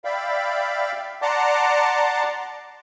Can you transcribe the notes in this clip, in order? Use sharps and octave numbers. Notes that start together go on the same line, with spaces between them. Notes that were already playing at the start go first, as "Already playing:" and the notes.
D5 E5 F5 G5 B5
D5 F#5 A5 A#5 C6 D6